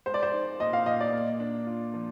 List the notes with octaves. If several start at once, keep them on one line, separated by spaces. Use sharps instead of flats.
G#3 C5
D5
C5
D#4
A#2 D#5
F5
A#2 D#5
D5
A#3
D4
F4
F3